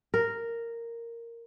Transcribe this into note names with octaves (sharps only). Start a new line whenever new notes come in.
A#4